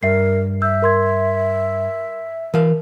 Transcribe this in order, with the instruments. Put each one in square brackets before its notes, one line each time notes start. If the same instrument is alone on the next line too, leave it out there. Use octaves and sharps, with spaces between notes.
[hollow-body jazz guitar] G2 [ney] A#4 [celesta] E5 C7
[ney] E5 [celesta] E6 G6
[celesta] A#4 C6 G#6
[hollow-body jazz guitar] E3 F5 [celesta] A#4